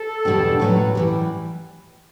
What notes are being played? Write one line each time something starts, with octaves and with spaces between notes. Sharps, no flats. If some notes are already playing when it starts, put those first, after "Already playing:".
Already playing: A4
E2 B2 G3 D4 G4
A2 F#3 C#4 F#4 B4
A2 E3 G3